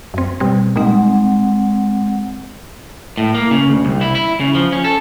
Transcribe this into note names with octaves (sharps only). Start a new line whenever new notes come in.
F#2 C4
B2 G3 C4
A#2 G3 G#3 C4 D#4 F#5
A2
A#3
C#3
D2
C2
E4
E4
C#3
F3
C#4
A4